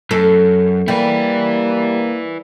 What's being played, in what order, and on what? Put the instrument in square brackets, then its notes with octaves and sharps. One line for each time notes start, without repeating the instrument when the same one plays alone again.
[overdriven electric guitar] F#2 [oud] A4
[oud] G3 [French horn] A#3 [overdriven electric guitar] E4 B4